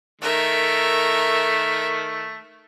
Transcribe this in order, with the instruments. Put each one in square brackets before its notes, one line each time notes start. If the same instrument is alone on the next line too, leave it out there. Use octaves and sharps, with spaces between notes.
[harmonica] D#3 A3 [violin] A#4 E5